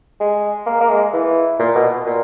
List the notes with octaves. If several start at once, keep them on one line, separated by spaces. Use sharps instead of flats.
G#3
A#3
A#3
G#3
E3
A#2
B2
A#2